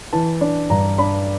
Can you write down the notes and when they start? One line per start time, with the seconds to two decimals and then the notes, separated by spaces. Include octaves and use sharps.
0.13 E3 A5
0.41 D4
0.70 G2 A#5
0.98 D4 B5